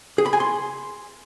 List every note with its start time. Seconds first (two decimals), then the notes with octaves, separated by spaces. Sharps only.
0.18 G#4
0.26 B5
0.33 G#5
0.40 C6